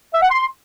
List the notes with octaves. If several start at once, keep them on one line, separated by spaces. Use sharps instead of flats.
E5
F#5
C6